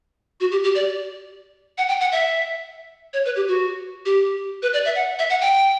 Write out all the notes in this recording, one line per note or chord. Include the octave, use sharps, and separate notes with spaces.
F#4
G4
G4
D5
F#5
G5
F#5
E5
C#5
B4
G4
F#4
G4
B4
D5
E5
F#5
E5
F#5
G5